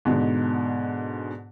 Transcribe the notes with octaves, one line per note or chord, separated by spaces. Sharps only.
G#2 B2 D3